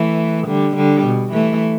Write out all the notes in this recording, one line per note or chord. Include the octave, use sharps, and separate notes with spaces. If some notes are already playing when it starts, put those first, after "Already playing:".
Already playing: E3 A3
D3 G3
D3 G3
B2
E3 A3